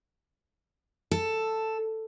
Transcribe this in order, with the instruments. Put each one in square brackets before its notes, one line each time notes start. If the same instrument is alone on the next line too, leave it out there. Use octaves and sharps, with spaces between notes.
[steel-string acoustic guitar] A4